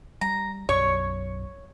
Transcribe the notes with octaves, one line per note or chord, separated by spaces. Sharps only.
G3 A#5
B1 F#2 F#3 C#5 C#6